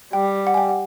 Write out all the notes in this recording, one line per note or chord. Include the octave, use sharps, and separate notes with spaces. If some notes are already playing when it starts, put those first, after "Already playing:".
G3 G5
F#5
G#5
G5
F#5